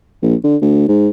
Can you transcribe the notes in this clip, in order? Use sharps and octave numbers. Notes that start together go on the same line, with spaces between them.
A#1
D3
D2
G#2